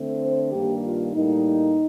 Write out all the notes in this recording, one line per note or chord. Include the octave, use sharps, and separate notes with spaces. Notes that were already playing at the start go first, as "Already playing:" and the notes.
Already playing: D3 A3 C4
C5
G2 D#3 G3 A#3 G4
F4
A2 G3 A#3 D#4